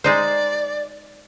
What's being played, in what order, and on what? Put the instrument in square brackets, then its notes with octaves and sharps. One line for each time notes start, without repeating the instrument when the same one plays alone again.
[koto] G#3 D#4 C5 [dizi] D5